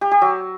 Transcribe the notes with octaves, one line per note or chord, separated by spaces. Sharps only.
G4
G4
F#3